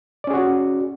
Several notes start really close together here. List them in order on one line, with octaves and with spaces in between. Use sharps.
D5 C#4 G#4 F#4